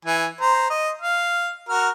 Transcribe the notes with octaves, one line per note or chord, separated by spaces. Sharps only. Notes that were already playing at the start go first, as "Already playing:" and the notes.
E3 G#5
C5 A#5
D#5
F5
F#4 A#4 F6